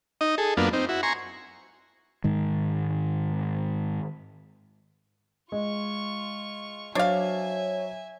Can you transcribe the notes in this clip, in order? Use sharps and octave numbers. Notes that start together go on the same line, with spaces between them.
D#4 D#5
G#4 A4
F#2 A#3 B3 D4 F4
C4 D#4
E4 F#4
G#5 A#5 C6 C#6
G#2 D#3 G#3
G#3 F4 C#6
F#3 D4 C5 C#5 E5 F5 G#5